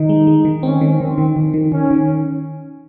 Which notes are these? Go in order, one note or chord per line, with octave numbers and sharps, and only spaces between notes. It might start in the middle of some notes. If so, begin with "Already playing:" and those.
Already playing: D#3 D#4
G#3
G#3
D#3
C4 C#4
D#3
D#3 C4
D#3
D#3
D#3
D#3 C#4
D#3